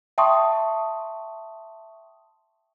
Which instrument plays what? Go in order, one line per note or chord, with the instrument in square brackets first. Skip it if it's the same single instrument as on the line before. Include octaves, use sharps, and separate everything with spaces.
[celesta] E5 G5 A5 C6 C#6 D#6